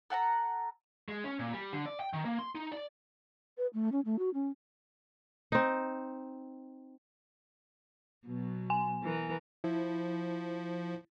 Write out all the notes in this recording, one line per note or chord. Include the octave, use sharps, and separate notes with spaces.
A4 F#5 G#5 A#5
G#3
C#4
A#2
G3
D3
D5
G5
D#3
A#3
C6
D#4
D5
B4
A3
C#4
A3
F#4
C#4
C4 D#4
B2 F#3 B3
G#5
E3 A#4 B4
F3 E4